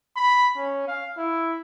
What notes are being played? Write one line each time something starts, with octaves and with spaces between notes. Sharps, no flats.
B5
C#4
F5
E4